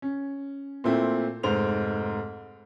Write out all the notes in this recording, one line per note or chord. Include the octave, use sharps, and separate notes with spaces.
C#4
A#2 A3 C4 E4
F1 G#2 C5 F7